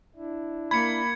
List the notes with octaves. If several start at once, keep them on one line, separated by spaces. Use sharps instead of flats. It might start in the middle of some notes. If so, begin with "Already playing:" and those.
D4 E4
A#3 B5 G#6 C#7